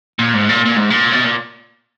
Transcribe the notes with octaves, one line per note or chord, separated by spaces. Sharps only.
A#2
G#2
A#2
A#2
G#2
A#2
B2
A#2